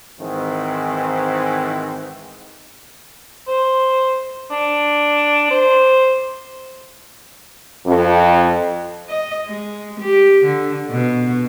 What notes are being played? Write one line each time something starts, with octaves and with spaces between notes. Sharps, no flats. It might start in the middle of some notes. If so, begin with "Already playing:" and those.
G#2 D#3 E3 C4
C5
D4
C5
F2
D#5
G#3
G4
D3
B2